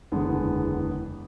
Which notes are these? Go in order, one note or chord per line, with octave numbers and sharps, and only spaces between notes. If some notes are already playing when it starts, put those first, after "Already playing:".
F#1 E2 D3 G#3 B3